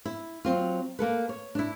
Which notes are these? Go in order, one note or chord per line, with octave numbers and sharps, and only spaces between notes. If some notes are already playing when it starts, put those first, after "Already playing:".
E4
F#3 C4 F4
A#3 A4 B4
C#5
D4 E4